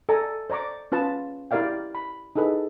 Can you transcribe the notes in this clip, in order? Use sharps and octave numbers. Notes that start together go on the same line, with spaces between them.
A4 D5 G#5 A#5
C5 D5 A#5 C#6 D6
C#4 F4 B4 A5 D#6
E4 G4 A#4 D5 F5 G5
B5
D#4 E4 G#4 A4 B4